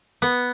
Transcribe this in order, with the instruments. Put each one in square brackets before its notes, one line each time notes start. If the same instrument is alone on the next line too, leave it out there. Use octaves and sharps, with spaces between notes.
[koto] B3